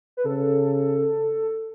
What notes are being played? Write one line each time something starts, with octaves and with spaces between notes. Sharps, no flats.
B4
C#3 A4